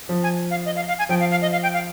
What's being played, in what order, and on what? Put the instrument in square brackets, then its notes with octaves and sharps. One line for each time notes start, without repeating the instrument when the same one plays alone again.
[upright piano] F3
[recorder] G#5
F5
D#5
F5
F5
G#5
[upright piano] F3 [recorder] G5
[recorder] F5
F5
D#5
F5
G5
F5